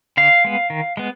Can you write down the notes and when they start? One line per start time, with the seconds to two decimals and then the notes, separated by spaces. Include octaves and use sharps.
0.17 D3 F5
0.45 G#3 B3
0.70 D#3
0.97 G#3 B3